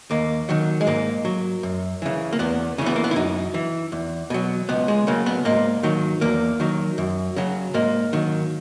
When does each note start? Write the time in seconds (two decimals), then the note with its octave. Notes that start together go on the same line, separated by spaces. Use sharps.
0.11 D#2 A#3
0.49 D#3 F#3
0.81 G#3
0.87 G#2 A#3
1.25 F#3
1.63 F#2
2.02 C#3 E3
2.33 A#3
2.39 E2 B3
2.78 C#3 E3 C#4
2.86 B3
2.96 A#3
3.04 B3
3.11 E4
3.16 F#2 D#4
3.54 E3
3.92 E2
4.30 B2 F#3
4.69 C#2 B3
4.88 G#3
5.07 C#3 F#3 A#3
5.26 B3
5.45 G#2 A#3
5.83 D#3 F#3
6.21 E2 A#3
6.60 D#3 F#3
6.98 F#2
7.36 C#3 F#3
7.74 G#2 A#3
8.13 D#3 F#3